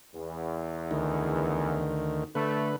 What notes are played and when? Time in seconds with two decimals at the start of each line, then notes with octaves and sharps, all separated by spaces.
0.15 E2
0.91 D2 D#3
2.35 D3 A3 B4